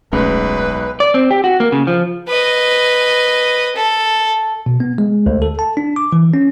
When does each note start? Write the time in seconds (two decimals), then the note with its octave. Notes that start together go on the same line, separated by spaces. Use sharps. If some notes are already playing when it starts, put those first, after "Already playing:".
0.13 D1 B1 G#3 A3 C#4 B4
1.00 D5
1.14 C4
1.31 G4
1.44 F#4
1.60 A#3
1.72 C#3
1.87 F3
2.28 B4 D#5
3.75 A4
4.66 B2
4.80 B3
4.98 G#3
5.26 D2
5.42 A4
5.59 A5
5.77 D4
5.96 D6
6.13 E3
6.34 C#4